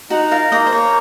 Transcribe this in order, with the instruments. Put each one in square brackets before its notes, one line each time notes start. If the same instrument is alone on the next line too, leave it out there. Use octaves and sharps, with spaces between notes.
[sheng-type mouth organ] D#4 [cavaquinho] F#4 F#5
[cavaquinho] F4 F5 [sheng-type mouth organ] A#4
[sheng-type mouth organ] A#3 [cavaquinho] D#4 D#5
[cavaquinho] C5
[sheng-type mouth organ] A#3 [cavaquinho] C#5